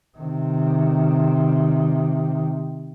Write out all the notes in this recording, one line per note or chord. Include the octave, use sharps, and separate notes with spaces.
C3 D#3